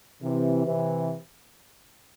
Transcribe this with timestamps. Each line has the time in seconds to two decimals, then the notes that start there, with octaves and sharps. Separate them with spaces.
0.22 C3 E3
0.66 C3 E3